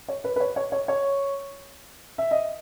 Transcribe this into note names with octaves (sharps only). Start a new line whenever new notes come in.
C#5
B4
B4
C#5
C#5
C#5
C#5
E5
D#5